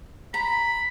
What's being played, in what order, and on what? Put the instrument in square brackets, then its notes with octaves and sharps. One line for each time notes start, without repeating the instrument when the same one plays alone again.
[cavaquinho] A#5 [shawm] B5